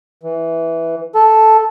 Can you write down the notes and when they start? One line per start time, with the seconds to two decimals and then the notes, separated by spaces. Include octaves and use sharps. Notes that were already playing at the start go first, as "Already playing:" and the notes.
0.23 E3
1.15 A4